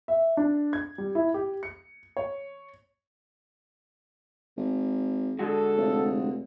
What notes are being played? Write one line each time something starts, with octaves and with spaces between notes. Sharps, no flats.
E5
D4
G#6
G3
E4
G4
C#7
C#5
G#1
D3 G#3 F#4 A4
F1